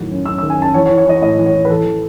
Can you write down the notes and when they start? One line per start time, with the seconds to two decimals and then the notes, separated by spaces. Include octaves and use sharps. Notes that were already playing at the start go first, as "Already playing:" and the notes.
Already playing: A2 D#3 F#3
0.10 F#2
0.26 F#2 E6
0.38 E6
0.43 D#3
0.50 G#5
0.58 F#2 A5
0.74 E3 C#5
0.86 C#5
0.90 E3
0.98 C#5
1.06 E3 D#5
1.16 C#5
1.22 A2 D#5
1.38 E3
1.46 C#5
1.53 A2
1.65 B4
1.70 E3 A4
1.85 E3